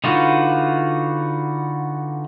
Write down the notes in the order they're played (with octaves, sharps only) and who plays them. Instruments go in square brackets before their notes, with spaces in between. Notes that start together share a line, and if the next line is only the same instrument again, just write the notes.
[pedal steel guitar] D3 D#4 F4 F#4 B4